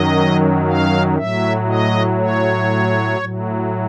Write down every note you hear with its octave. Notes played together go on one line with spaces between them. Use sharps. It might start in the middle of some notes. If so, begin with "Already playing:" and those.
Already playing: F#2 D#3 F#3 D#5
F5
A2 F#3 E5
D#5
C#5
A2 F#3